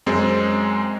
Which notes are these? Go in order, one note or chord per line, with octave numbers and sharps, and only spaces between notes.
F#2 G#3 C4